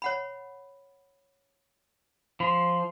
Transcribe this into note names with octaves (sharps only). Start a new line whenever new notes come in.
C#5 F#5 B5
F3 C6